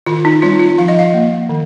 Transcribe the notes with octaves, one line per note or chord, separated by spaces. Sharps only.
D#3 F4
D#4
G3 C4 F4
F4
F3 F5
D#5
F5
A#3
D#3